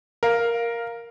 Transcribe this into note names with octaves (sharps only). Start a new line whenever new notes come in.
A#4 F5